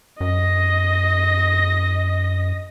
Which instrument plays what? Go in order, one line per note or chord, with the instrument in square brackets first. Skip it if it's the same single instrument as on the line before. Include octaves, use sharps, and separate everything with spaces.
[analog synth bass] F#2 [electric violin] D#5 A#6